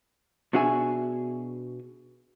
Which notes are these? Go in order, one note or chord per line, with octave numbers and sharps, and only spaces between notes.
B2 D4 F#4 G#4 E5 G#5